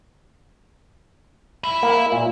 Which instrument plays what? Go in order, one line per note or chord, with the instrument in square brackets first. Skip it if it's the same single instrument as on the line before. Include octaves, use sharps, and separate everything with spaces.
[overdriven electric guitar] E5 B5
[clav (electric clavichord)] A#3
A#2